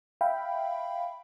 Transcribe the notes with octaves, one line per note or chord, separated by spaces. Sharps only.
E5 F5 G5 B5